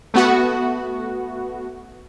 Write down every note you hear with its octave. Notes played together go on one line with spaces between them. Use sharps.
A3 B3 F#4